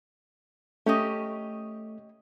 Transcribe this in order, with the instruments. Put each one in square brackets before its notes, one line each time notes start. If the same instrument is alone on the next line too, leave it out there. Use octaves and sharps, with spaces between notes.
[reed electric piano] A3 [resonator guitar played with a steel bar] C#4 G4 D#5